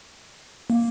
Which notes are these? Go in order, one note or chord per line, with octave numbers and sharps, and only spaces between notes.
A#3